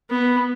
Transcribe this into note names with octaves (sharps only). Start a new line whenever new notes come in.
B3